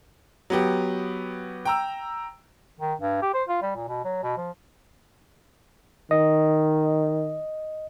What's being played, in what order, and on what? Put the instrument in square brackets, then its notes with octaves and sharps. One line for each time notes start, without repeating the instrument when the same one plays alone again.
[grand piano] F#3 B3 G4
G5 A#5 E6
[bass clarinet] D#3
G2
G4
C5
F4
G3
A#2
B2
F#3
B2
F3
[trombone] D#3 [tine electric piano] D#5